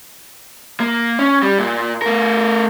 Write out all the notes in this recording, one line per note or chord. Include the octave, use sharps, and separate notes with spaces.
A#3
C#4
G3
A#2
A3 A#4